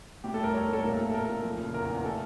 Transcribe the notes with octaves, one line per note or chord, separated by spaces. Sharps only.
A2 G4
A4
G3 A#4
G3 C#5
A#4
A2 A4
A#2 A#4
A3
A4
A3 A#4
A#2
F3
C#3
E2 A#4
E2
A3 A4